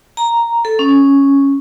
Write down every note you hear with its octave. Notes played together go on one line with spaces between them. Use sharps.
A#5
A4
C#4